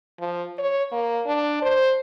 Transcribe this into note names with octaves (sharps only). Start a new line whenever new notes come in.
F3
C#5
A#3
D4
C5